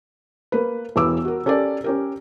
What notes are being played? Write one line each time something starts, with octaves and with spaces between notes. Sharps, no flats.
A#3 B4
E1 E3 B4 D6 E6
F#4 A#4
C#4 G4 A4 A#4 D5
C#4 G4 A#4